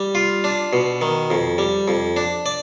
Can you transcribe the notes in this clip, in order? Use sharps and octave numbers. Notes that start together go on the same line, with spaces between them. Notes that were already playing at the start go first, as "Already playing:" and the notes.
Already playing: G3
F4
D4
B2
D#3
F2
G3
F2
D4
D5